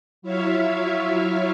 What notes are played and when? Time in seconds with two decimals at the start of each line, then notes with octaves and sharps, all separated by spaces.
0.22 F#3 E4 F4 C#5 E5 F5